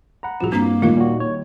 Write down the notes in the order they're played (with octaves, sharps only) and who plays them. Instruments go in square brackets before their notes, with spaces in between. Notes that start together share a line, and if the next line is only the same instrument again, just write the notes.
[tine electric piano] F#5 A#5 [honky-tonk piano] B5
[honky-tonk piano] C2 F3 [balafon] F#4 G#4
[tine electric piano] G2 [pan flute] A#3 [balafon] C4 D4 A#5
[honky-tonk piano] D#2 D#3 G3 [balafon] F4 A#4 F5
[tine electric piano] A#2 F#4
C#5